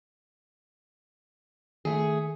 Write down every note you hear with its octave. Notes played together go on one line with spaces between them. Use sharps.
D#3 A3 G#4